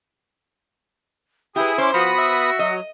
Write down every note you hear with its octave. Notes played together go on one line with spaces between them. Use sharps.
E4 G4 G#4 B4 D#6
C#4 C5 D6
F3 B3 F#4 B5 D#6
E5
F#3 D#5